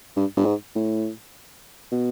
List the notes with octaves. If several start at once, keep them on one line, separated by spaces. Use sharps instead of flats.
G2
G2
G#2
A2
B2